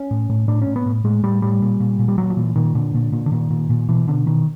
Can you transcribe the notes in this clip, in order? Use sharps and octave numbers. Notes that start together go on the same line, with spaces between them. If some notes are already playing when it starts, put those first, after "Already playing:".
Already playing: C#4
A2
A2
A2 D4
A2 C#4
B3
A2
A2 G#3
A2 G3
A2 G3
A#2
A#2
A#2
G3
A#2 F#3
F3
A#2 E3
A#2 D#3
A#2 D3
A#2
A#2
D3
A#2 D#3
A#2
A#2
B2 E3
B2 D3
B2 D#3